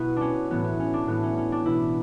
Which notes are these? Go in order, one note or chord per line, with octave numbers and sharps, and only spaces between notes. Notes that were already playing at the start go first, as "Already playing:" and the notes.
Already playing: B2 B3 E4 F#4
C#4 D4
A2 E3 B3
B3
C#4
D4
A2 E3 B3
C#4
C#4
D4
B2 E4